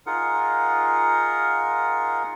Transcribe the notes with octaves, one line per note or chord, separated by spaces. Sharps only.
D#4 F4 G#4 A#4 F#5